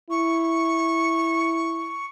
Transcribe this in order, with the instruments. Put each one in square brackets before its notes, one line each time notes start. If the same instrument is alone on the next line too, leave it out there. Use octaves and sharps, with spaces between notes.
[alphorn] E4 [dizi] C#6